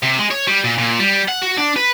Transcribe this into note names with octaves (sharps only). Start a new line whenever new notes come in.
C3
G#3
C#5
G3
A#2
A#2
G3
F#5
F#4
D4
B4